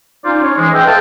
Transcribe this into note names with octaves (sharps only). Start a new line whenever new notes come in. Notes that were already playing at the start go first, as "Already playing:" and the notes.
C#4 D#4 F4 C5 D5
C#5
E3 G#3
G#4 B4 D#5 E5 G5
A4 C5 F5 G5 A5